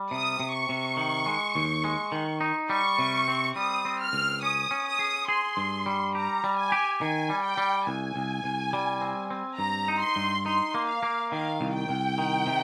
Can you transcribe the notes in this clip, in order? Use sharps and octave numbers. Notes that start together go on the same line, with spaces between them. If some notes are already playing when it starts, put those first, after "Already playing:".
Already playing: G3
C3 D#6
C3
C#6
C3
D#3
G#3
D#2
G#3
D#3
D#4
G3 C#6
C3
C4
G3 D#6
C4
F6
C#2
C#4 D#6
C#4
D#6
G#4
G#4 C6
G2
G3
G4 A#5
G3
G#5
G4
D#3 G#5
G3
G5
G3
C2 G#5
C2
C2
G3
C4
C4
G2 A#5
D#4
C6
G2
D#4 C6
A#3
F5
A#3
D#3 F5
C2
G5
C2
D#3
C3